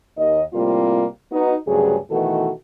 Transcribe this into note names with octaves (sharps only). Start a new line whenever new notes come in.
D#2 D#5
A2 C3 G3 A#3 C4 F4
B3 D#4 F#4
D2 G2 C#3 F#3 G#4
B2 D#3 E3 A3 F#4 A4